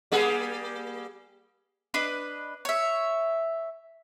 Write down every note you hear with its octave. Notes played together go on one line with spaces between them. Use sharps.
G3 A#3 G#4
D4 B4 D#5
C#5 E5